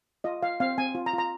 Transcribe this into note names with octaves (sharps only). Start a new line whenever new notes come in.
F4 D#5
F4 F5
C4 F5
C4 G#5
F4
A#5
F4
A#5